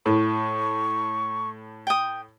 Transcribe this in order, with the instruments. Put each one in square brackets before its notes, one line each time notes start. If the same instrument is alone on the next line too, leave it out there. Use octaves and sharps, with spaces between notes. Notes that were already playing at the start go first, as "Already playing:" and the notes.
[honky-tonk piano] A2 [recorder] C#6
[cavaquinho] G5 D#6